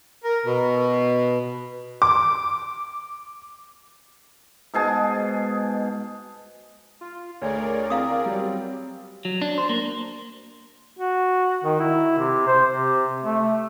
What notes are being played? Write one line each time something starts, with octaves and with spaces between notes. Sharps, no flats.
A#4
B2
D6
G#2 B2 G#4 A5
F4
D2 G#4 A#4 C#5 D5
C4 E4 F5 D#6
F#3 G3
F#3
D4
C5
A#3
F#4
D#3
E4
C3
C5
C3
A3